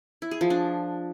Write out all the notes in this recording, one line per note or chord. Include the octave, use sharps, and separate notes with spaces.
E4
G#4
F3
D4